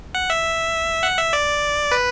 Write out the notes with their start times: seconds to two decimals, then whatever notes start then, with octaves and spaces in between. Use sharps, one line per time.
0.15 F#5
0.30 E5
1.03 F#5
1.18 E5
1.33 D5
1.92 B4